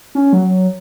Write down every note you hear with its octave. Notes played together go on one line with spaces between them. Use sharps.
C#4
F#3